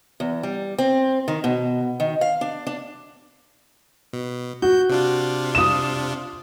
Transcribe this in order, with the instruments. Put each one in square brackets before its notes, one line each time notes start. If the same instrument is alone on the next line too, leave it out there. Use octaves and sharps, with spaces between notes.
[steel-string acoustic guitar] E2
G3
C4
D#3
B2
D#3
F5
D4
D4
[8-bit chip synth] B2
[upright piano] F#4 [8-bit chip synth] G6
[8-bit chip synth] C3 D4 F4
[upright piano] D#6 E7